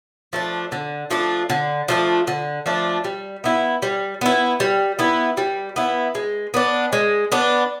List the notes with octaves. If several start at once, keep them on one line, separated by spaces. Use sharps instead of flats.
F3 A3 D4
D3
F3 A3 D4
D3
F3 A3 D4
D3
F3 A3 D4
G3
B3 E4
G3
B3 E4
G3
B3 E4
G3
B3 E4
G#3
B3 D4
G#3
B3 D4